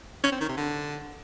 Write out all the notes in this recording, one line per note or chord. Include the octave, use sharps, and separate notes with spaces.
C#4
C4
D#3
C3
D3